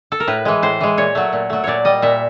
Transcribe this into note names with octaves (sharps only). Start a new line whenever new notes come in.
A4
A#4
A2 B4
E3 G#3
A2 C5
E3 G#3
A#2 C#5
F#3 A3
A#2
F#3 A3
A#2 C#5 D5
G3 D#5
A#2 E5